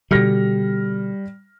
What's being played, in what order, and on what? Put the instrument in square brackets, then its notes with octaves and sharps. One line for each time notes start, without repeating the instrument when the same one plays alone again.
[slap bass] B2 D3 [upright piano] G3 F6 A#6